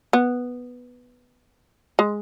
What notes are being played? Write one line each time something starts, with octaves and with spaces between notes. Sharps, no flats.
B3
G#3